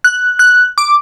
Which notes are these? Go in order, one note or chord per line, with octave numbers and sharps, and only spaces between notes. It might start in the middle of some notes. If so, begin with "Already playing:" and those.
F#6
F#6
D6